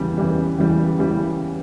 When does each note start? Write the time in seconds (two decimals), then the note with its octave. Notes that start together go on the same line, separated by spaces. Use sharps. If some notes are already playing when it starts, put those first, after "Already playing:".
Already playing: E2 C#3 E3 G3
0.18 E2 C#3 E3 G3
0.58 E2 C#3 E3 G3
0.98 E2 C#3 E3 G3